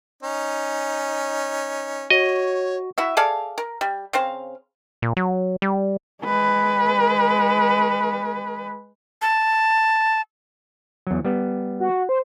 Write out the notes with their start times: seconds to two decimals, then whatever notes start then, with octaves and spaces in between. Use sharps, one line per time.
0.23 C#4 D#4
2.10 F#4 C#5 D#5
2.98 E4 F#4 E5
3.17 G#4 A4 D5 F5
3.58 A#4
3.81 G3
4.13 C#3 C4 C5 F5
5.02 A#2
5.17 F#3
5.62 G3
6.24 G#3 B4
9.22 A5
11.07 E2 F#3
11.25 G3 B3
11.80 F#4
12.09 C5